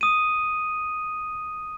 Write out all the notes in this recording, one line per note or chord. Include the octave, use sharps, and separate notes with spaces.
D#6 D#7